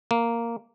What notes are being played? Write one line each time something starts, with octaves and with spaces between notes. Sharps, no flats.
A#3